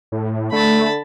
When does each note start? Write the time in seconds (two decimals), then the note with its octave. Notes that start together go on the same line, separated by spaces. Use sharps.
0.12 A2
0.52 D3 A3 A5 B5